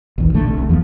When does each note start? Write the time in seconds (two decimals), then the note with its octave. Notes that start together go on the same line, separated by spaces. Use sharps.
0.18 B1 E2 D#3
0.34 E1 A#1 D3 A3
0.47 C2 C3
0.69 E2 F3 B3